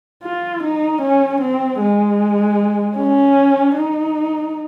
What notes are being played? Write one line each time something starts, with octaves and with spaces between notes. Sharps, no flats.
F4
D#4
C#4
C4
G#3
C#4
D#4